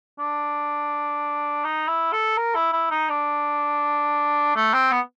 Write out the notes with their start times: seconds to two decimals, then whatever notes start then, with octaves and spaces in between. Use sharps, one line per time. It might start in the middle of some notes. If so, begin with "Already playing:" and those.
0.19 D4
1.65 D#4
1.88 E4
2.13 A4
2.37 A#4
2.55 E4
2.73 E4
2.91 D#4
3.09 D4
4.56 A3
4.74 C4
4.92 B3